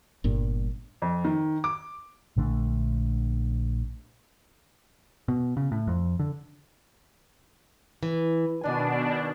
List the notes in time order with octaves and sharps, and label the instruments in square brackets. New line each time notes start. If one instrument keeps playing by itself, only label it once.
[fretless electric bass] G1 G2 A#2
[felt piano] F2
D#3
D6
[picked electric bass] A#1 D3 A3 D4
B2
C#3
A2
F2
D3
[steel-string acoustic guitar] E3
[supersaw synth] B2 D4 [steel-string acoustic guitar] D#3 G#5